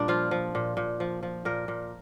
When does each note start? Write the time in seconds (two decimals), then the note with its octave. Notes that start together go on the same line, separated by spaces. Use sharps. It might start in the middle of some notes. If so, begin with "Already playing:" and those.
Already playing: A#2 G3 D4
0.08 F3 F4
0.31 F3
0.55 A#2
0.77 A#2
1.00 F3
1.23 F3
1.45 A#2 A#4
1.68 A#2